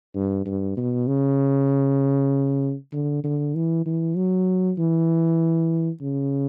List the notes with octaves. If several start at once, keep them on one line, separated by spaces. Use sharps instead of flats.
G2
G2
B2
C#3
D3
D3
E3
E3
F#3
E3
C#3